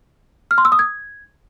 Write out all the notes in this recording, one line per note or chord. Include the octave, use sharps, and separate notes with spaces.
F6
C6
E6
D#6
G#6